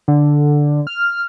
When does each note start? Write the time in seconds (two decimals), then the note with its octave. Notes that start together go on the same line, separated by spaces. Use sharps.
0.08 D3
0.87 F6